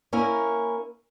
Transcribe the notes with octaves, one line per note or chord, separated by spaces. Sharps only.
A#3 C#4 E4 A#4